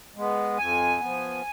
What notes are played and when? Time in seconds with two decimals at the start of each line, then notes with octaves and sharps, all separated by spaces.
0.16 G#3 B3
0.58 F2 G#5
1.00 F3 B3